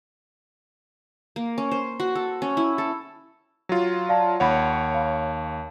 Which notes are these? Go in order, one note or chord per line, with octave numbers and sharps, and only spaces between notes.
A#3
C#4
C5
F#4
A4
C#4
E4
A4
F#3 F4
D5 F5 A5
D#2 C#5 F#5 B5
F5